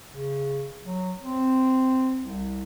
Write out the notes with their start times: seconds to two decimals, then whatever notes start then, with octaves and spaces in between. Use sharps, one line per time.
0.10 C#3
0.84 F#3
1.22 C4
2.20 C2